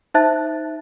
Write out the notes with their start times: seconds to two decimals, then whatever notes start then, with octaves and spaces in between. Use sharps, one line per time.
0.14 D#4 C5 E5 A5 F#6 A6